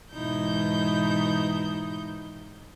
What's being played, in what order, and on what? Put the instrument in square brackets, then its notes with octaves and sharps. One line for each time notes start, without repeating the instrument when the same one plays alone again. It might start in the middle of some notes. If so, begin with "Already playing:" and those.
[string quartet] G#2 B2 E3 D#4 E4 G6